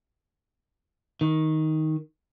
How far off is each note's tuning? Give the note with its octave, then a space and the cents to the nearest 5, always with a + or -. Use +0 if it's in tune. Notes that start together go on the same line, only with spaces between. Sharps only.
D#3 +10